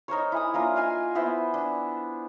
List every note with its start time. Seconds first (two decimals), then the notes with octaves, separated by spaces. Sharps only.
0.08 D#4 A#4 C5 C#5
0.32 E4 G#5 D#6
0.54 A#3 D4 F4 A#4
0.75 D#4 F5 G#5 C6
1.15 B3 E4 C5 E5
1.54 D4